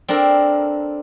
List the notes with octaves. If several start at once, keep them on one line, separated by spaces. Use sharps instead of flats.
C4 D4 A4 A#4